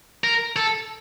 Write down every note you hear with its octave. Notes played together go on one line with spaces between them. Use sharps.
A#4
A4